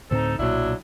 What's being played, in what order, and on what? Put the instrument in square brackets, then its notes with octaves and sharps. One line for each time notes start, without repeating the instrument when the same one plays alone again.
[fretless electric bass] D2 A2 C4 [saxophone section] D#4 A4 C5
[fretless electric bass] B1 A#2 [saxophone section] F#3 D4 E4